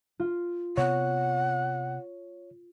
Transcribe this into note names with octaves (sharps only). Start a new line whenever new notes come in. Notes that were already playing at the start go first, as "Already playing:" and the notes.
F4
C3 B3 C#5 F#5 C#7